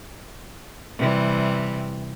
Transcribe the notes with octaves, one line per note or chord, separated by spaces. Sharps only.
C3 E3 G3